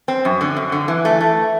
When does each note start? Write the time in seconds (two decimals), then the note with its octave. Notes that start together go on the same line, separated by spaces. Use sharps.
0.08 C4
0.25 F#2
0.41 D3
0.57 F#2
0.72 D3
0.88 E3
1.05 A3
1.21 A3